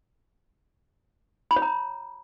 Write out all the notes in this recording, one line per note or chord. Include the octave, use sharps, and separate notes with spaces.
B5
C#5
A#5